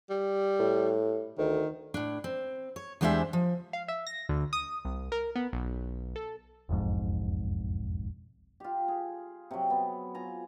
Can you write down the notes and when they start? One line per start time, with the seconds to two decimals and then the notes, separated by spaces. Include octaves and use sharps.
0.10 G3
0.59 A2
1.38 D2 D#3
1.94 A2 D4
2.24 C4
2.76 C#5
3.01 E2 G3 G#3 D4 C5 E5
3.33 F3
3.73 F5
3.88 E5
4.07 A#6
4.29 D2
4.53 D#6
4.85 C2
5.12 A#4
5.36 B3
5.53 B1
6.16 A4
6.69 E1 B1 F2 G#2
8.60 F4 G4
8.88 G#4
9.51 C3 F#3
9.70 B3
10.15 F4 G#5 A#5